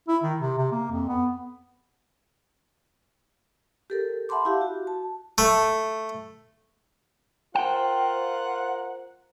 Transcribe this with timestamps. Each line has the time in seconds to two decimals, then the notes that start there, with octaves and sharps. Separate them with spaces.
0.09 E4
0.24 D#3
0.40 C3
0.59 C3
0.72 A#3
0.91 F2
1.09 B3
3.90 G4 A4 A#4
4.29 E5 F#5 A5 B5 C6 D6
4.45 E4 G4 F5
4.61 F#4
4.87 A5
5.38 A3
7.55 F4 A#4 C5 F#5 G5